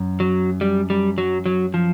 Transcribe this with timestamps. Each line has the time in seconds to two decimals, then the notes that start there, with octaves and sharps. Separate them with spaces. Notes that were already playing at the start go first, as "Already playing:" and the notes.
Already playing: F#2
0.20 F#3
0.61 G3
0.90 G3
1.18 F#3
1.46 F#3
1.74 F3